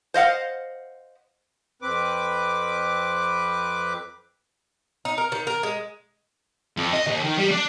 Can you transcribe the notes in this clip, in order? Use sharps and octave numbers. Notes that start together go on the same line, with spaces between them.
C5 D#5 F5 F#5
F2 C4 B4 D6
D#4
A#4
D#3
A#4
G#3
F2
D#5
D#2
D#3
G3
D4